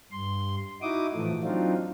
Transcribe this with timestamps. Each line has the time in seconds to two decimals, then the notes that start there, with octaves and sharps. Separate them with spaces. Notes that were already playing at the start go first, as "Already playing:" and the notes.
0.12 G2 C6
0.82 D#4 E4 F#4 D6 D#6
1.14 A2 E3 F3 A3
1.44 F#3 C4 D4 D#4 F4